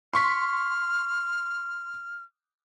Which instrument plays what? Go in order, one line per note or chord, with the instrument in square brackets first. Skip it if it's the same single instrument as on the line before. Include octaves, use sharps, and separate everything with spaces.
[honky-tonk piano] C6 C#6 B6 [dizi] F6